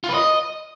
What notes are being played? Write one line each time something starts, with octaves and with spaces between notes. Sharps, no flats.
F4
B4
D#5